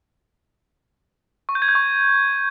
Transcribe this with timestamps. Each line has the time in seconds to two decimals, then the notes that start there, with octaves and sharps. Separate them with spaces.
1.49 C#6
1.55 G6
1.62 G#6
1.69 G6
1.75 C#6